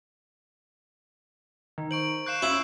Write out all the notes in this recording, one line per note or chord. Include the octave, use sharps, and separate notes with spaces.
D#3 D#4
C5 C#6 D7 F#7
F5 C#6 F#6 G6 C7 E7
C#4 E4 F4 D7